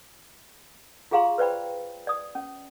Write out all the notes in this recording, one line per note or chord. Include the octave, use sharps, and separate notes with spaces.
F4 G4 G#4 F5 A#5 C6
B4 C5 D5 G5 B5
D5 D#6
C#4